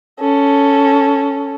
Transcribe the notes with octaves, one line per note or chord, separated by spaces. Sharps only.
C#4 A4